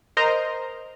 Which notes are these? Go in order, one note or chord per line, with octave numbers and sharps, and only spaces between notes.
A#4 C5 D#5 A#5 C6